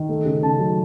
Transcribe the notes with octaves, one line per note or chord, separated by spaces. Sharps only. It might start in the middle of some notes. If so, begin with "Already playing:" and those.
Already playing: D#3
A3
C#3
C#3 A5
F#3